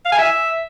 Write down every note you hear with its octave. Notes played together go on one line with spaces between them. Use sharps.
F5
G#5
E5